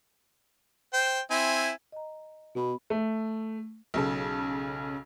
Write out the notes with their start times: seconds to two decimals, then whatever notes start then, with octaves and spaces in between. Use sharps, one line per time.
0.93 C5 G5
1.31 C4 E4 G#5
1.92 D#5 A#5
2.55 B2 B3 B5
2.90 A3
3.94 B1 C#3 A4